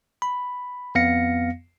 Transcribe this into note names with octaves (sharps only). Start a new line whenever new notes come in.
B5
F2 B3 F5 A#6 C#7